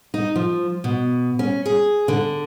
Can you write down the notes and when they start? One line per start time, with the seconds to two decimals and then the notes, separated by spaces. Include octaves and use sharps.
0.14 D#4
0.36 F3
0.84 B2
1.39 C#4
1.66 G#4
2.08 D3